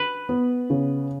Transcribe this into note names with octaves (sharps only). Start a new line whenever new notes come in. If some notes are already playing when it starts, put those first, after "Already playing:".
Already playing: B4
B3
C#3